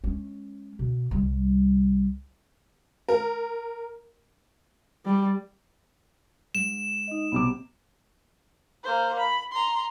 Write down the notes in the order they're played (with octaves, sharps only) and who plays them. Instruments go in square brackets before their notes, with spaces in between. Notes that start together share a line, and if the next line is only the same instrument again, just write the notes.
[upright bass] G#3 C#4
B2
C2 G3
[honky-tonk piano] A#4
[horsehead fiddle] G3
[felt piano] G#2 [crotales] E7
[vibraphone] D#4 D#5
[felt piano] B1 C3 D6 [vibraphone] B3
[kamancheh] A#3 C5
B5
A#5 C6